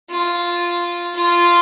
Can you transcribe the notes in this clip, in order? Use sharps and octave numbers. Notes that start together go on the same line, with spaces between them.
F4
F4